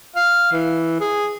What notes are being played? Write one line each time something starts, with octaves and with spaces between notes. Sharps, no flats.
F5
E3
G#4